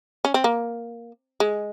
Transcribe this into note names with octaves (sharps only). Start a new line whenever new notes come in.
C#4
C4
A#3
G#3